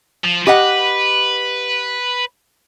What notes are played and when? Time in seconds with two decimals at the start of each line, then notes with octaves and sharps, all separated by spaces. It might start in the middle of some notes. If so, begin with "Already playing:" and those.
0.25 F3
0.47 G4 B4 D#5 F#5